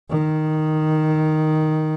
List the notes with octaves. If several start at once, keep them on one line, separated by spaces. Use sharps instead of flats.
D#3